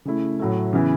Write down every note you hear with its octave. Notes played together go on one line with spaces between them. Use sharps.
C#3 A3 E4
A2 F#3 A3
C#3 E3 B3 E4